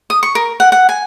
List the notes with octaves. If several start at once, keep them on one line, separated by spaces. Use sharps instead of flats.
D#6
C#6
A#4
F#5
F#5
G#5